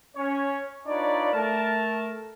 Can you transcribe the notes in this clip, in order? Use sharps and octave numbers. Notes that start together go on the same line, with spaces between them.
C#4 C#5
D4 D#4 F4 B4 C#5 D5
A3 A#4 A5